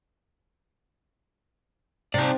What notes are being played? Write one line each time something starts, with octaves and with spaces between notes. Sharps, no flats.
C3 D#4 D5